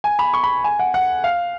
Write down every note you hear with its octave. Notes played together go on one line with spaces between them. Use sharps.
G#5
B5
C#6
B5
G#5
F#5
F#5
F5